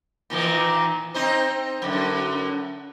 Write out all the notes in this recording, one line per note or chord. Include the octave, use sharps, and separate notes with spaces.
A#2 D#3 E3
C4 D#4 C5
F#2 D3